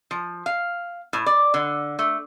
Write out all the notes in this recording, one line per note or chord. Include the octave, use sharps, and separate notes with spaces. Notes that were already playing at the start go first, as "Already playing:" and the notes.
F3
F5
A2
D5
D3
A3